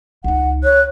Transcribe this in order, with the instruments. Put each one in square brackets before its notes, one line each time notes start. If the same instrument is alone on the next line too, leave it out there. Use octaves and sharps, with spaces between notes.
[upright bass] C#2 D#4 [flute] F#5
[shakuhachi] C#5 [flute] F#6